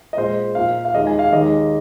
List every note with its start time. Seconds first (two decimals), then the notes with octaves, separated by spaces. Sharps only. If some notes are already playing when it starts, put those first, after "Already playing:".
0.13 D#5
0.17 A#2 G#3 C5
0.55 A#2 A#3 F5
0.85 F5
0.94 D#2 D#3 G#3 D#5
1.07 G#5
1.19 F5
1.32 D#2 D#3 G#3 D#5